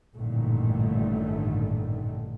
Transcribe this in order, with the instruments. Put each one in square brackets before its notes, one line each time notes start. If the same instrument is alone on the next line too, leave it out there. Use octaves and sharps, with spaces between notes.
[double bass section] A1 G2 A#2 D3 D#3 A3